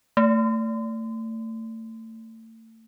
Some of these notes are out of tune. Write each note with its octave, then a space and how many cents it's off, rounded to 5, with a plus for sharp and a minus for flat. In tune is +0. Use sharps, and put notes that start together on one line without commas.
A3 +30